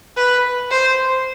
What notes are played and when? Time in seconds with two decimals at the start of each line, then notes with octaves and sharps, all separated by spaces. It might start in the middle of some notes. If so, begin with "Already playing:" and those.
0.17 B4
0.71 C5